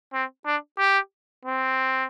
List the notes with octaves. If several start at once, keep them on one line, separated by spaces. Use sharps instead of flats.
C4
D4
G4
C4